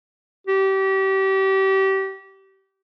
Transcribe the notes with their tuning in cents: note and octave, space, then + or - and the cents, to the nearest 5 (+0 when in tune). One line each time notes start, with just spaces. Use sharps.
G4 -30